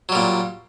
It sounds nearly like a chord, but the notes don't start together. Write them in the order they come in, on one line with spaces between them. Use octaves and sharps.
F#3 G3 A#2